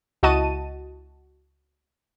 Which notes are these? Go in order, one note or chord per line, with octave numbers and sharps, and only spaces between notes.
C#2 E4 F#4 D#5 A5 D#7